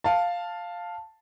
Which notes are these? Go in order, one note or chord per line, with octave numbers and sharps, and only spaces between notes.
F5 A5